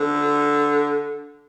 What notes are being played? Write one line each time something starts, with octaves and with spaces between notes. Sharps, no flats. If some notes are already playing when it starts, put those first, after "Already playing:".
Already playing: D3